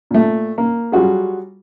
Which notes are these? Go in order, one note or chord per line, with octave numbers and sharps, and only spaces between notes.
A#2 A3
A#3
F#3 G3 F4 F#4 G#4